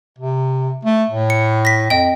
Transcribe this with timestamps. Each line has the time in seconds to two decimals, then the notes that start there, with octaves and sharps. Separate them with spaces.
0.18 C3
0.85 A3
1.10 A2
1.30 C#7
1.65 A#6 B6
1.90 F2 D#5 G5